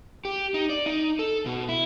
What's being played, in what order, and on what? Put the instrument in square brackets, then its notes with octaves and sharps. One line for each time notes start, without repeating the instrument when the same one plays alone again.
[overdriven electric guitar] G4
D#4
D5
D#4
A4
B2
E4